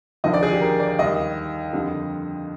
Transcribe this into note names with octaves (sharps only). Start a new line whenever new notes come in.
D#2 D3 F3 D#5
D5
G#4
G4
A#4
D5
D#2 D#3 G3 D#5
F2 D3 G3